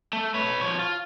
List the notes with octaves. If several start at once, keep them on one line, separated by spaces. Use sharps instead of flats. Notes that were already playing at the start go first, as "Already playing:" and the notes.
A3
B4 C#5
F3 C#5
F4